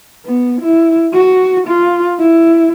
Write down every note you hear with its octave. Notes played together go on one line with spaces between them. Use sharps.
B3
E4
F#4
F4
E4